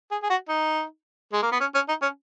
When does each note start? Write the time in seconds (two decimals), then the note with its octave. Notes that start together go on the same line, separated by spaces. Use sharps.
0.11 G#4
0.23 G#4
0.30 F#4
0.49 D#4
1.33 G#3
1.42 A#3
1.52 B3
1.60 C#4
1.74 C#4
1.88 D#4
2.02 C#4